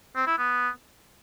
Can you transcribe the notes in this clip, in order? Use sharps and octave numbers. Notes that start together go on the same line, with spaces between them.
C4
E4
B3